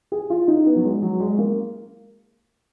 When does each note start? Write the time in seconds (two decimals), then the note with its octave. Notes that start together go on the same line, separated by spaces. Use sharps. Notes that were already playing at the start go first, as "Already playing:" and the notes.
0.12 G#4
0.30 F4
0.48 D#4
0.66 B3
0.76 F#3
0.84 G#3
1.02 F#3
1.20 G#3
1.39 A#3